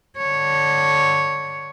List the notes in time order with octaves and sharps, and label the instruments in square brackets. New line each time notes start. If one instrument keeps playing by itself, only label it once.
[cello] D3 C#5